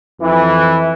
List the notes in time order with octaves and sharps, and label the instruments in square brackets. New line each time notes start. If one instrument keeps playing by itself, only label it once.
[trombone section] F2 E3